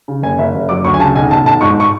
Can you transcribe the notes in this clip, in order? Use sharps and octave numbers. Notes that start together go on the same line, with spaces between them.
C#3
F#1 G#5
F#1 E5
F#1
F#3 D6
D2 C#6
G#5
C#3 A5
B1 G#5
B1 A5
B1 A5
G#2 C#6
C#6